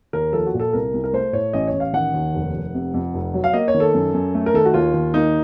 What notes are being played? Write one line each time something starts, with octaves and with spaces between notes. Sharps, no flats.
D#2 A#4
F3 A4
F#4
A#2
A4
C2 A#4
C2
A#4
A3 C5
A2 C#5
A1 D#5
C#5
A1
F5
D#3 F#5
D#2
F1
F1
C3
F2
F1
F#3
F5
A#3 D#5
C#5
D#3
A4
F#2
F#2
A3
A#4
D#3 A4
F#4
D#2 F4
D#2
A#3 D#4